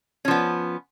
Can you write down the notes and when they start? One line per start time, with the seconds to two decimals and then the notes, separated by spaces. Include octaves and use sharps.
0.25 C#4
0.28 F3
0.31 B3